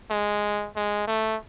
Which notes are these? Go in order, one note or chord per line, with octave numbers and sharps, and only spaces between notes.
G#3
G#3
A3